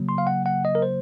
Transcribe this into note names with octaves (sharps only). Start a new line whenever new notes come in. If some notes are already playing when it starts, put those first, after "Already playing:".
Already playing: C#3 F#3 A#3
C6
F5
F#5
F#5
D#5
A#4
C5